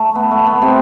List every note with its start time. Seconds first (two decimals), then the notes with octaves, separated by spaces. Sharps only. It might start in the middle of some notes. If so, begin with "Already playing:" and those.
Already playing: A3
0.15 B3
0.31 A3
0.46 B3
0.62 C3 C4